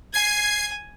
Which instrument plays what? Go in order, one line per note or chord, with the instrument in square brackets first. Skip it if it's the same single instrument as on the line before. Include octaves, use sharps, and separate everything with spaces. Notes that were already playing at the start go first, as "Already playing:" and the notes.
[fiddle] G#5 [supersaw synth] G#6 C7